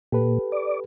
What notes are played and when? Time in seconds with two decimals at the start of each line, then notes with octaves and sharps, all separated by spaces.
0.12 A#2 G4 A4 B4
0.52 D5